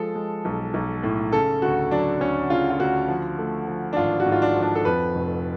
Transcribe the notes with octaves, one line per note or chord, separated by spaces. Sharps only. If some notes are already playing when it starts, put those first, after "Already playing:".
Already playing: F3 G#3 A4
G#3
B1
B1
A2
C#3 A4
D2 F#4
F#3 D4
D2 C#4
C#3 F4
F4
D2 F#4
F3
A3
F3
D4
G#1 F4
F#4
G#2
F4
D4
F3
D4
A4
F2 B4
F1